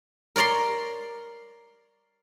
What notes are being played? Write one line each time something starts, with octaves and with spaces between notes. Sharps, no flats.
A#4 C#5 D5 A#5 C6